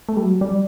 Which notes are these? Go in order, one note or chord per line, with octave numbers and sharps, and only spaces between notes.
A3
G3
F#3
G3